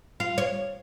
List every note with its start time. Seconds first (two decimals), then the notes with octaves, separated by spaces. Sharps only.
0.20 F4
0.38 C#5